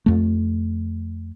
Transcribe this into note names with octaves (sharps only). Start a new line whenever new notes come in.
F2 A3